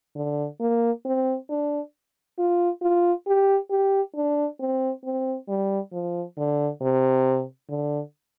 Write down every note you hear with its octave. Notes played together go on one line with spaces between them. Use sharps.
D3
A#3
C4
D4
F4
F4
G4
G4
D4
C4
C4
G3
F3
D3
C3
D3